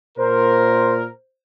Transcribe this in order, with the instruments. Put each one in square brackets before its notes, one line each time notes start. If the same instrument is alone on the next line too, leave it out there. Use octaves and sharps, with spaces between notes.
[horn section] A#2 A#4 [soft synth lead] C5